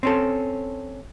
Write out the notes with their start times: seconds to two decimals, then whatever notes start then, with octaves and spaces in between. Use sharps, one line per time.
0.03 C4 C#4 A4